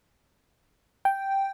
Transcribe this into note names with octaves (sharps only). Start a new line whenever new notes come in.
G5